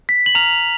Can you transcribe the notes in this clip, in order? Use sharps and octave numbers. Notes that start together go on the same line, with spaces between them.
B6
F#7
A#5 F6 F7